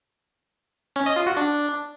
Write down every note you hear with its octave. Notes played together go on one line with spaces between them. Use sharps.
C#4
D#5
F4
F#4
D4